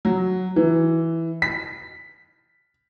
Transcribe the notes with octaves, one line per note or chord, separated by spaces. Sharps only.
F#3
E3
B6